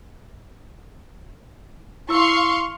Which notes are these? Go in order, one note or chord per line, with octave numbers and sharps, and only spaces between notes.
E4 F5 C6 C#6 E6